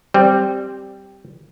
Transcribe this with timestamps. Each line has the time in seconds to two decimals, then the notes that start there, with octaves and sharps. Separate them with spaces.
0.14 G3 C4